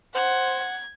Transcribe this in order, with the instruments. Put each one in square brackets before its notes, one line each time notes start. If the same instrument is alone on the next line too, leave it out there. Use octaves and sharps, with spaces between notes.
[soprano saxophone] C5 [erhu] F#5 [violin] G#6